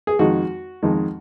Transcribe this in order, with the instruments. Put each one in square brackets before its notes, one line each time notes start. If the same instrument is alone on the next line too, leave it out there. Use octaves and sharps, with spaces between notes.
[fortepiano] G#4
F2 D#3 G#3 D#4 F#4
F2 D#3 G#3 D#4